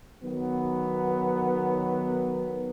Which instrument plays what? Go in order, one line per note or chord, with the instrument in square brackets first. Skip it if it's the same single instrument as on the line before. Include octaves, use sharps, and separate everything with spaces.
[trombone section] D#3 F#3 B3